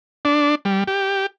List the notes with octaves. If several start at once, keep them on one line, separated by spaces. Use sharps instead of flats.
D4
G3
G4